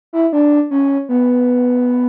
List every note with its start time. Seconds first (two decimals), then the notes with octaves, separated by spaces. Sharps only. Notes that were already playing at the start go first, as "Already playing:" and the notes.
0.13 E4
0.33 D4
0.71 C#4
1.09 B3